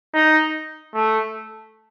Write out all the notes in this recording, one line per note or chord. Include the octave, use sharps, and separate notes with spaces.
D#4
A3